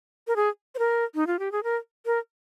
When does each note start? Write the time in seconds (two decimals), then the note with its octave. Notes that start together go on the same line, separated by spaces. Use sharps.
0.27 A#4
0.36 G#4
0.75 C5
0.79 A#4
1.15 D#4
1.27 F4
1.39 G4
1.52 G#4
1.63 A#4
2.06 A#4